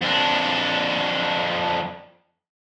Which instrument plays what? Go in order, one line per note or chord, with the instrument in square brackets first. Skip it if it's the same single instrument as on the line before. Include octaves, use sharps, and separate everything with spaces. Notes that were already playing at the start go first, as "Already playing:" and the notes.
[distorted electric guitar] F2 D4